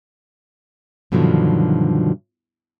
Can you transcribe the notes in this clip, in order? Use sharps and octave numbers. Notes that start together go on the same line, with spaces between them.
G2 B2 D3 D#3 F3 F#3